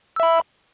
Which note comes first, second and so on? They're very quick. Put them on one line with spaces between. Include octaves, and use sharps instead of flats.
E6 E5 B5